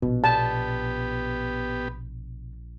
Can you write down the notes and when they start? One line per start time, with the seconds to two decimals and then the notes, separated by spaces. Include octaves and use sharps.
0.02 A#1 B2
0.24 B3 G4 A5